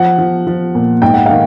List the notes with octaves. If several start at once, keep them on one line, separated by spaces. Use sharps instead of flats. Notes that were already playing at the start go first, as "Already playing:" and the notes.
Already playing: F3 F#5
F3
F3
A#2
G#2 G5
F#5
D#3 F5